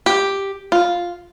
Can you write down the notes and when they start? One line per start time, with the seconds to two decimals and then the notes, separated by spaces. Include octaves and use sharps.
0.06 G4
0.72 F4